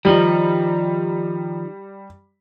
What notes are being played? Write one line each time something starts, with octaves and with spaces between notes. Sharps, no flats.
D#3 F3 G3 D#4